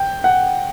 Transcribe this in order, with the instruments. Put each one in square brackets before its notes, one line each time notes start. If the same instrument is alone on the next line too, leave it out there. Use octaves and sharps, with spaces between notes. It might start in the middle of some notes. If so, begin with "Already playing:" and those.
Already playing: [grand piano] G5
F#5